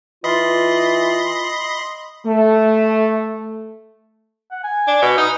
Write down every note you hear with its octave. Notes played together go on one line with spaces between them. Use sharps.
E3 F4 D#5 B5 C6
A3
F#5
G#5
D4
B2
D#4 B4